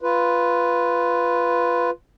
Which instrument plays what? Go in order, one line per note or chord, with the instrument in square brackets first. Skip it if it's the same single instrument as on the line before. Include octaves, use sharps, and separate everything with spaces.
[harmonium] F4 B4